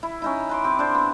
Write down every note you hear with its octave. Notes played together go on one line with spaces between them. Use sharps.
E4
C#4 D#4 E4
B4 C6 D6
C4 G4
D4 C5 D5
B3